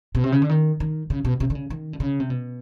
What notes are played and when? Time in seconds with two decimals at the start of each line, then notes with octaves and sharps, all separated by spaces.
0.15 B2
0.24 C3
0.32 C#3
0.42 D3
0.49 D#3
0.80 D#3
1.10 C#3
1.25 B2
1.40 C3
1.50 D3
1.55 C#3
1.70 D#3
1.93 D3
2.00 C#3
2.20 C3
2.30 B2